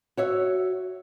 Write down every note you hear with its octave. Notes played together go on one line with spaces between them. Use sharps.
F#4 C#5 E5